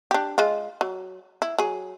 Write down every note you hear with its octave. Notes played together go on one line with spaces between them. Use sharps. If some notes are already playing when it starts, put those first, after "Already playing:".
D4 G4
G#3 F4
F#3
E4
F#3 G#4